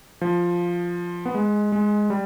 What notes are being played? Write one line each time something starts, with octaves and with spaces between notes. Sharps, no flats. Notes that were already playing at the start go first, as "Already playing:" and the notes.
F3
B3
G#3
G#3
G3